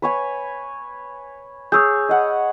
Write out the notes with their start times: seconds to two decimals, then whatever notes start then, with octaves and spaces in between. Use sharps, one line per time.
0.02 B4 C#5 G#5
1.72 G#4 C#5 D#6 E6 G6
2.09 D#5 F#5 B5